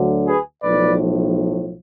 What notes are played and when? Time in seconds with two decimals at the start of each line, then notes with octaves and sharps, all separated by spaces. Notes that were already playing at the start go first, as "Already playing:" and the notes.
Already playing: D2 D3 F#3
0.27 G#4 B4
0.62 B1 A2 F3 B4 D5